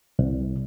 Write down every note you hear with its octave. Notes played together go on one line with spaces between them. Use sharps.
C2